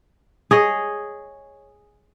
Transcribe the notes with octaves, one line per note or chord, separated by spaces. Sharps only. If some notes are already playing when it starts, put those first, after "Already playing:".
G#4 C#5 D#5